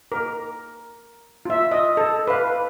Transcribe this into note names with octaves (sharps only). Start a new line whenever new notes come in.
A#4
F4 E5
D#5
A4
B4 F5